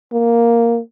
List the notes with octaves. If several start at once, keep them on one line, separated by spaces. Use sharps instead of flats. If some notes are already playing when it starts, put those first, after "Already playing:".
A#3